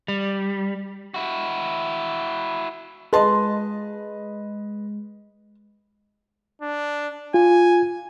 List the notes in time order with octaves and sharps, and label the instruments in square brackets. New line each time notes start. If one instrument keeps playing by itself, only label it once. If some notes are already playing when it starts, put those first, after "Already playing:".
[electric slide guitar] G3
[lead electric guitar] E4 F#4
[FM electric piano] G#3 [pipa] F4 A5 C6 [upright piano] B4 D#5
[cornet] D4
[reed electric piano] F4 [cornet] G#5